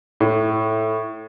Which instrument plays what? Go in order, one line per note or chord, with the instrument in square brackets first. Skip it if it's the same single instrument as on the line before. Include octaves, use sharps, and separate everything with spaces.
[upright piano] A2